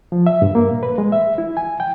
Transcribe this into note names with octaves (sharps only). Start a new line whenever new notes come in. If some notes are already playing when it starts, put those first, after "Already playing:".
F3
E5
G2
A#3
A#2
B4
G#3
E5
E4
G#5
G5